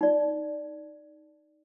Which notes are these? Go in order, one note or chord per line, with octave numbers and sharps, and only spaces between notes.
D#4 D5